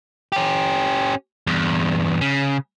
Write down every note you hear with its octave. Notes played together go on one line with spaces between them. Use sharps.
C#4 G4
E2 G2
C#3